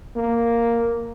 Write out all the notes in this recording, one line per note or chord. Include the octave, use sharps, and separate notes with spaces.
A#3